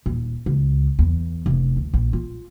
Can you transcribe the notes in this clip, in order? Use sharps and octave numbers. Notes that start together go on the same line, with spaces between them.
D#1
C#2
E2
F1
D2
A#1
F4